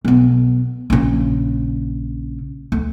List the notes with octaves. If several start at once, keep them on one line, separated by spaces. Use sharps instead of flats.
B1 B3
A#1 C#3
D2